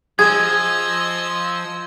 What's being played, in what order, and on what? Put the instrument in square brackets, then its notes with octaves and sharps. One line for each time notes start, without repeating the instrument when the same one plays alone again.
[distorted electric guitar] F3 [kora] G#4 [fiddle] D#5 E6 [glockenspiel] G#6